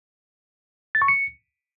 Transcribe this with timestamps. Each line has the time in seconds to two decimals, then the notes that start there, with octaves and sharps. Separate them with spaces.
0.95 A6
1.02 C#6
1.08 C#7